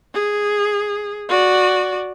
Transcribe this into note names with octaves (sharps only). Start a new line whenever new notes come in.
G#4
F#4 D5